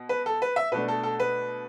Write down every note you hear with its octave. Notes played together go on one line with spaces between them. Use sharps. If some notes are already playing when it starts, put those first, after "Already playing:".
Already playing: B2
B4
A4
B4
E5
B2 A3 D4 B4
A4
A4
B4